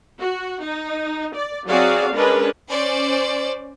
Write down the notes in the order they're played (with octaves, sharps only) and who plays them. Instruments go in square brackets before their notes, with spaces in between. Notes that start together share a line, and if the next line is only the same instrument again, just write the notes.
[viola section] F#4
D#4
D5
F#3 C4 F#4 G#4 D5 F5
G#3 C#4 D4 A#4 B4
[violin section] C#4 C5 D5